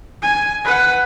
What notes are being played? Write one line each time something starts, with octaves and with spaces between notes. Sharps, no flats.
G#5
B4 F#5